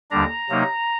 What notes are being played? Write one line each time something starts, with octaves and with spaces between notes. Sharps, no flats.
D#2 D3 G3 D4 A#5
C3 F#3 A#3 D#4